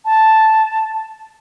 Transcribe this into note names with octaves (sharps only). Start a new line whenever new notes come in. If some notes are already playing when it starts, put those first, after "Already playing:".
A5